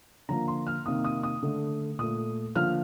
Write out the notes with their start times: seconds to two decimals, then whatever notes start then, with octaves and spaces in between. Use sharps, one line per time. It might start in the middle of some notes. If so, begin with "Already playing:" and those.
0.29 D3 F3 A#3 A#5
0.48 C6
0.67 F6
0.86 C3 D#3 A#3 D#6
1.04 D#6
1.23 D#6
1.43 D3 A3
1.99 A#2 A3 D#6
2.55 D3 F3 A#3 F6